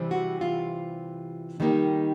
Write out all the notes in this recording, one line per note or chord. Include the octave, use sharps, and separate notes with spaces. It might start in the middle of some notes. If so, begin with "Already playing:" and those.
Already playing: C3 E3 G3 C4
F#4
F4
D#3 G3 A#3 D#4